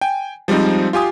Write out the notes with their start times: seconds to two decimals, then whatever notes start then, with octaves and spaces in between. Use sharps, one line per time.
0.01 G5 G#5
0.48 F3 G3 G#3 C4 D#4
0.93 F4 G4 G#5 D#6